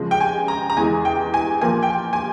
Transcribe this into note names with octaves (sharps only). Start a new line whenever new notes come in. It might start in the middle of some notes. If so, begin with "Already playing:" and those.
Already playing: C#3 F3 G#3
G5
G#5
A#5
A#5
E2 E3 G#3 G#5
G5
G#5
A#2 F3 A#3 G#5
G5
G#5
G#5